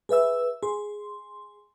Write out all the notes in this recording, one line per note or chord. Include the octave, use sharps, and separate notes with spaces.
G#4 B4 E5 E6
G#4 C6